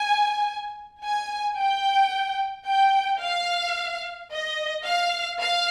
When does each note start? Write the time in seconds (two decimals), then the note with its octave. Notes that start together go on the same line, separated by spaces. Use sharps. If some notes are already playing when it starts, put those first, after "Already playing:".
Already playing: G#5
1.03 G#5
1.57 G5
2.67 G5
3.22 F5
4.31 D#5
4.85 F5
5.39 F5